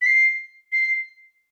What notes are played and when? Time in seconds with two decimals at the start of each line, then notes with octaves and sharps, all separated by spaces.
0.02 B6
0.06 C7
0.72 C7